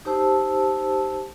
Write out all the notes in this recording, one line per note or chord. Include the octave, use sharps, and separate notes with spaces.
D#4 G4 C5 A5 E6